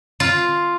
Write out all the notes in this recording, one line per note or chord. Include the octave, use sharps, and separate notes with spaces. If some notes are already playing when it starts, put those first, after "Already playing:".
F4